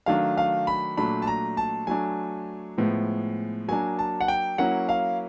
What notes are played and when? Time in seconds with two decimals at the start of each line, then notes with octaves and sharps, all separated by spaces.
0.06 D#3 F#3 A3 D4 F5
0.38 F5
0.67 B5
0.97 A#2 F#3 A3 D4 B5
1.22 A5
1.27 A#5
1.57 A5
1.87 F#3 A3 D4 G#5
2.78 A2 F3 G#3 B3
3.68 F#3 A#3 D4 G#5
3.99 A5
4.21 F#5
4.28 G5
4.58 F#3 A#3 C#4 E4 F#5
4.89 F5